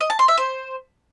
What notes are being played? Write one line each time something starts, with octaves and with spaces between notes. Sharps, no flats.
D#5
A5
C6
E5
C5